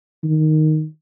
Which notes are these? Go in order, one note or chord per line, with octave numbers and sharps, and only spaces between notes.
D#3